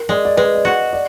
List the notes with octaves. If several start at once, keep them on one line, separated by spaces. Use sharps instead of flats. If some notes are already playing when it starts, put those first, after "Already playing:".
Already playing: A#4
G#3 D5
D5
G#3 B4
D5
F#4 D#5
D5